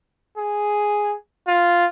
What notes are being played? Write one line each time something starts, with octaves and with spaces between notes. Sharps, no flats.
G#4
F4